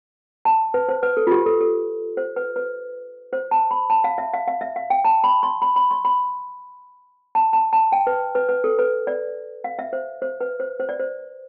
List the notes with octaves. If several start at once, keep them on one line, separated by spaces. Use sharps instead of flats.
A5
B4
C5
B4
A4
F4
G4
A4
A4
C5
B4
B4
C5
A5
B5
A5
F5
E5
F5
F5
E5
F5
G5
A5
B5
C6
B5
B5
C6
B5
A5
A5
A5
G5
B4
B4
B4
A4
B4
D5
F5
E5
C5
C5
B4
C5
C5
D5
C5